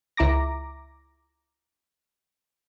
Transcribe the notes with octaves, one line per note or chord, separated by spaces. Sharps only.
C#2 E4 A#5 D6 A#6